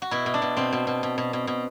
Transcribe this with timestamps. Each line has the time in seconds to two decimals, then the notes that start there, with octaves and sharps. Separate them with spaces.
0.02 F#4
0.11 B2 E4
0.26 B2
0.34 D4
0.42 B2
0.57 B2 C4
0.73 B2
0.87 B2
1.03 B2
1.18 B2
1.33 B2
1.47 B2